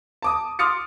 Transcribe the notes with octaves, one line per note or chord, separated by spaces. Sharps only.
A5 D6 D#6
C6 D6 D#6 F6 A6 C#7